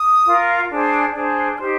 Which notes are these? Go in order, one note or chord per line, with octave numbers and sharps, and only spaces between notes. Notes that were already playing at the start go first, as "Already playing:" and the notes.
Already playing: D#6
F4 A#4
D4 G#4 C5
D4 G#4 C5
D#4 G4 C5 F6